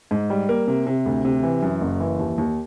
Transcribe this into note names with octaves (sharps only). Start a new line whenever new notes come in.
G#2
G3
A#3
C3
C3
D2
C3
E3
F#2
F#1
E3
D#2
D#2